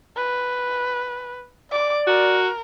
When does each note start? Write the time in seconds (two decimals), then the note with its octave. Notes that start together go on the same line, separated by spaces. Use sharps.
0.16 B4
1.72 D5 D6
2.07 F#4 A#4